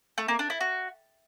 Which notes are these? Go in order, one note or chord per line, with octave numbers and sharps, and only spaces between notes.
A3
A#3
D4
E4
F#4